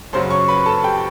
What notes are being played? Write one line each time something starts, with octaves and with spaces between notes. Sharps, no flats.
F#2 C#3 F#3 C5 C6
C#5 C#6
B4 B5
A4 A5
G4 G5